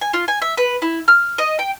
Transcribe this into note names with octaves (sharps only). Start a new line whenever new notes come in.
G#5
F4
G#5
E5
B4
E4
F6
D#5
G5